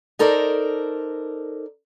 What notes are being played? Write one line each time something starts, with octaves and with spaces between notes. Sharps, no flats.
D#4 A4 A#4 C5 D5